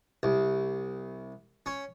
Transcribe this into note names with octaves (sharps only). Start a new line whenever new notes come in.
C2
C#4